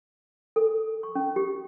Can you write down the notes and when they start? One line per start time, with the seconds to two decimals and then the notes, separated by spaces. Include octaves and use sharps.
0.56 A4
1.03 C#6
1.15 C#4
1.36 G4